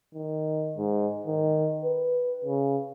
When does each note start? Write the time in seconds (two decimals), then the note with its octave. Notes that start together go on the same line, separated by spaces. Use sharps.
0.15 D#3
0.77 G#2
1.26 D#3
1.84 B4
2.45 C#3